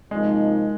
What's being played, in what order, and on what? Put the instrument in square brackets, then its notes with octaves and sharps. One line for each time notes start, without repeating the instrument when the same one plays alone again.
[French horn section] C3 F3 A#3 D#4 [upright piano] G#3